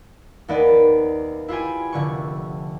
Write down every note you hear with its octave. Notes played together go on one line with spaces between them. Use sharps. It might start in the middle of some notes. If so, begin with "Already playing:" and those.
D#2 A#3 B3 D#4 D5
E4 F4 G4 G#5
F1 D3 C#6